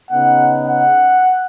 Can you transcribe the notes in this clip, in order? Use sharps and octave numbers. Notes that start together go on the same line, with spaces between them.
C#3 B3 D#4 F#5
F#5